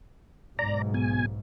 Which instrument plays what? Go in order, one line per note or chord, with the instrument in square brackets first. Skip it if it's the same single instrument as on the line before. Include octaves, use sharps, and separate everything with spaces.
[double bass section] B1 G#2 [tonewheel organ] D5 A#5
[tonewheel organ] B2 G#5